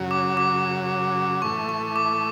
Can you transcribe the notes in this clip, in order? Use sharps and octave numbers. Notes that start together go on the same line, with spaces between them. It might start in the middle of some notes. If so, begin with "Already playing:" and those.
Already playing: F#2 C#3 F#3
D6
D6
A2 E3 A3 C#6
C#6
D6